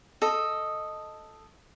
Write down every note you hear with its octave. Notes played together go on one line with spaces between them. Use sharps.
A4 D#5